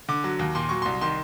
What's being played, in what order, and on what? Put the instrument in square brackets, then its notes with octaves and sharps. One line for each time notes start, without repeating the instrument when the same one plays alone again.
[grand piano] D3 D6
F#3
D#2
A#2 C6
F#3 C#6
C2 C6
D#3 C6